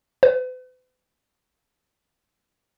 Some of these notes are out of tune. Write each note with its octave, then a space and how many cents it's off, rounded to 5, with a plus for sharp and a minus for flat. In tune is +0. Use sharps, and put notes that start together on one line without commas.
B4 +45